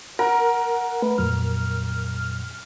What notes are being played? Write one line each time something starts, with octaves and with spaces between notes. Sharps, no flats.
A#4 F#5
A3 B4
F2 A#2 F#3 F6